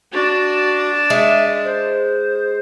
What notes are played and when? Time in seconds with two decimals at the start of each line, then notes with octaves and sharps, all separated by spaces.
0.13 D4 F#4 A5
1.10 G#3 E5
1.65 C5